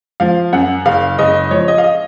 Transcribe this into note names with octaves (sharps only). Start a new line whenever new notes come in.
F3 F5
F#2 F#5
F#1 F5
F#1 D#5
F3 C#5
D#5
F5
D#5